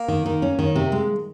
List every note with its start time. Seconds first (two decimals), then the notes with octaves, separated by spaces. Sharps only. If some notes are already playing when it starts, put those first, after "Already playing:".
Already playing: A#3
0.08 D#3
0.26 D#3
0.42 C#4
0.59 D#3
0.75 C3
0.92 G#3